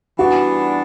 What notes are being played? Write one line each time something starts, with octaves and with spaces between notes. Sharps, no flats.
E3 G3 B3 D4 F#4